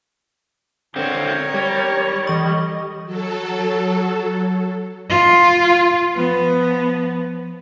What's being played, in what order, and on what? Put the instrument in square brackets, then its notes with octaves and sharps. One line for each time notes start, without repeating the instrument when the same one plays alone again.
[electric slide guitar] D3 C4 [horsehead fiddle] A#4 C#5
[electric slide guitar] G3
[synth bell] E3 C#6 [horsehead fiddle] D#5
[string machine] F#3 A4
[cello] F4
F3 B3